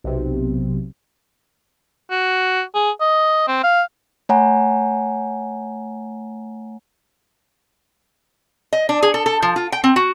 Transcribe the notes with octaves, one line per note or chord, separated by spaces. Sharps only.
B1 C3
F#4
G#4
D#5
C4
F5
A3 C#5 F#5 G#5 A#5
D#5
D4
G#4
A4
A4
F3
F4
G5
C4
F#4